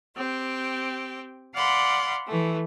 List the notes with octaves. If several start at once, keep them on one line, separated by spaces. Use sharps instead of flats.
C4 G4 G5
D5 F5 F#5 B5 C6
E3 A3